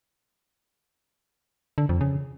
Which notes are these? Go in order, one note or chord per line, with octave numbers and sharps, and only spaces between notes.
D3
F2
C#3